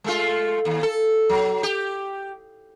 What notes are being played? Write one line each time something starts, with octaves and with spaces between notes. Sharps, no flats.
G#3 A3 F4
D#2
A4
F#3
G4